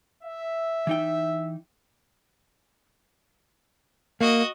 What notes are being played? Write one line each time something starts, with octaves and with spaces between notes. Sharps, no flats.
E5
E3 D#4 G5
A#3 F#4 D#5